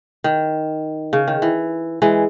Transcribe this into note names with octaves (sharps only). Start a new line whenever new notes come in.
D#3
C#3
D#3
E3
E3 G#3